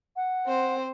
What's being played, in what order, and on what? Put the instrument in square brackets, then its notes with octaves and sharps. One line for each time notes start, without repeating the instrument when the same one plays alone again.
[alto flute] F#5
[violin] C4 C5